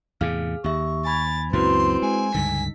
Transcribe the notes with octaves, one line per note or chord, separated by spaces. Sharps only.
E2 A2 C3 G#4 F5 F6
D#2 G4 E5 C#6
G#5 B5 G#6 A6
C#2 F#2 A#2 C4 E4 F#4 B4 C6
G#3 G#5
C#2 G2 D3 D#4 B6